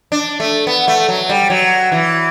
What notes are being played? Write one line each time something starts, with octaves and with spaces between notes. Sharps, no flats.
D4
A3
B3
A3
F#3
G3
F#3
E3